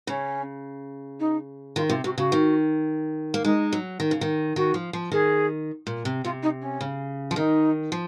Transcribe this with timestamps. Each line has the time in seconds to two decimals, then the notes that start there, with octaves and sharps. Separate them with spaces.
0.07 C#3 C#4
1.19 D#4
1.76 D#3 F4
1.89 C3 F4
2.04 C3 F#4
2.18 C#3 F#4
2.32 D#3
3.34 A#3
3.44 G#3 D#4
3.73 F#3
4.00 D#3
4.11 C#3
4.21 D#3
4.56 D#3 F#4
4.74 F3
4.93 F3
5.12 D#3 G#4
5.87 A#2
6.05 C3
6.24 C3 F4
6.42 D#4
6.61 C#4
6.81 C#3
7.31 F3
7.36 D#3 D#4
7.92 F3